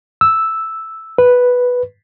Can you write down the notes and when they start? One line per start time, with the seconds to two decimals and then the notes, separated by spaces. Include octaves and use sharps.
0.21 E6
1.18 B4